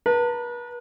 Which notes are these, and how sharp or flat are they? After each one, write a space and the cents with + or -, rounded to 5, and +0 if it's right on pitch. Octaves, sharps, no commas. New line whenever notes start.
B4 -40 A5 +40